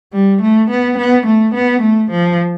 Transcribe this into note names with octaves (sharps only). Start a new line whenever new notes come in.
G3
A3
B3
B3
A3
B3
A3
F3